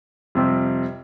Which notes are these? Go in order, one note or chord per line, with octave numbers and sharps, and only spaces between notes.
F2 C3 G3